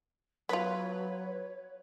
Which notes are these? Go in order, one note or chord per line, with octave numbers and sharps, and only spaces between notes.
F#3 B3 F4 B4 C#5